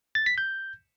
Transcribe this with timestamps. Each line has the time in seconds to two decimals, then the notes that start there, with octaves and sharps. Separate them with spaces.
0.15 A6
0.26 B6
0.38 G6